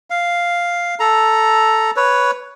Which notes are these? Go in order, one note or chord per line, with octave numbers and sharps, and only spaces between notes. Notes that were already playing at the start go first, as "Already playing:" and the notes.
F5
A4 A#5
B4 C#5